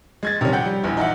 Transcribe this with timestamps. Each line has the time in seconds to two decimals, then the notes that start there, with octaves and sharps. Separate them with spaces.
0.23 G#3 G#6 A6
0.41 C3 D#3 F3 G3 C#4
0.53 F#5 G5 G6
0.66 G3
0.84 A#1 E2
0.97 D#4 F4 E5 F#5